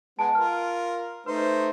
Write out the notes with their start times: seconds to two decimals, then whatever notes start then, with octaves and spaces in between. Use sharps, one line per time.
0.19 G#3 B3 A5 D7
0.35 F4 A#4 F6
1.26 A3 D#4 B4 C5